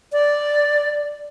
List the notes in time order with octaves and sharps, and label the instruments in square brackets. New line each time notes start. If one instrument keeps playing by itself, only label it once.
[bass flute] D5